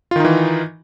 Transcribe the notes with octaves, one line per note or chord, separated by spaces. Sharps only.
D#3 E3 D#4 F4